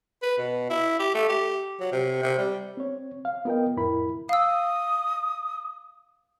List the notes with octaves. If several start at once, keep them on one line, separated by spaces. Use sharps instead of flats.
B4
B2
E4
G4
A3
G4
F#3
C3
C3
G3
C4 C#5
F5
B3 F4 A#4 D#5 G5
F2 A2 E4 A#4 B5
F5 D#6 E6